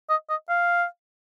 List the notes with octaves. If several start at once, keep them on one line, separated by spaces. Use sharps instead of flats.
D#5
D#5
F5